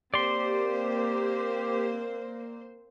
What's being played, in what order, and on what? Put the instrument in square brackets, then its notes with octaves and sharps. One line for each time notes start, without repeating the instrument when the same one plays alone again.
[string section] A#3 [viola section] C4 C5 [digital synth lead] G4 [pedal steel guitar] D5 C6